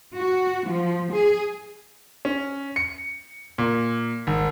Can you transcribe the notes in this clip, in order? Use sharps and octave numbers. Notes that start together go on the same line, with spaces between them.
F#4
F3
G#4
C#4
C#7
A#2
G#1